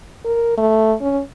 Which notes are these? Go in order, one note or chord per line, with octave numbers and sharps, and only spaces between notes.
A#4
A3
C#4